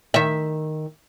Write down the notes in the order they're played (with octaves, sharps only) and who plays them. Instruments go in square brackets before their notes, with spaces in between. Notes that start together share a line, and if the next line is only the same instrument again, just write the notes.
[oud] D#3 E5